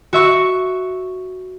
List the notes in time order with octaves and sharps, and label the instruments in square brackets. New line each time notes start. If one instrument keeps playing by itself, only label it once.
[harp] F#4 E5 C#6